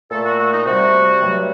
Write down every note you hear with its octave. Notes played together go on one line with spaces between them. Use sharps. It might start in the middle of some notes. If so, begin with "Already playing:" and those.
A#2 A3 A4
F#4
F#4
D#4
C3 G3 F#4
G2 F#3 A3